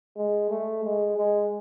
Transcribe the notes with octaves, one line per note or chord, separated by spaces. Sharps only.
G#3
A3
G#3
G#3